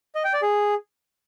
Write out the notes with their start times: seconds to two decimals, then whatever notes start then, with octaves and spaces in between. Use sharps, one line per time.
0.15 D#5
0.24 G5
0.33 D5
0.42 G#4